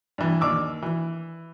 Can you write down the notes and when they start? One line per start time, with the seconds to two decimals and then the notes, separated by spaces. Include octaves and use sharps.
0.18 G2 E3
0.41 D#2 D4 D6 E6
0.82 E3